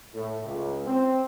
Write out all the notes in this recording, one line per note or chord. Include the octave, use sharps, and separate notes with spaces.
A2
C#2
C4